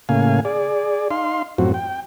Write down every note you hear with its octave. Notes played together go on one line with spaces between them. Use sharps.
A2 C#3 A#3 F5 G#5
G#4 D5
D#4 F5 C6
F#2 A2 F3 F#3 C4 F#4
G5